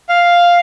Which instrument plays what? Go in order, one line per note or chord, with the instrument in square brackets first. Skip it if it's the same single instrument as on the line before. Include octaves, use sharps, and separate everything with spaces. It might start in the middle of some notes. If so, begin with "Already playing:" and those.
[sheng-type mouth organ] F5